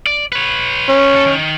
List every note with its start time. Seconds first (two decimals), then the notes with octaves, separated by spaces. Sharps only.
0.06 D5
0.32 B4 C#5
0.89 C#4
1.14 D#2 A4
1.27 D#3